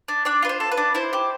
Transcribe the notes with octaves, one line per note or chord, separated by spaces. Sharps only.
D4
D4 D5
F4 B4
C5
A4
B4
D4
E4 C5
G4